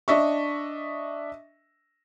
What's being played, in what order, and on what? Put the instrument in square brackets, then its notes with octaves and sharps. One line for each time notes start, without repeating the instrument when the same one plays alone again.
[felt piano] D4 D#5 E5 C#6